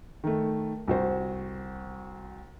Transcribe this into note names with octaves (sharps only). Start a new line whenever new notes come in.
D#3 A3
C2 F#4 C5